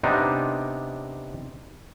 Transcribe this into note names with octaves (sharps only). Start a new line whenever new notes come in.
C3 B3 D4 D#4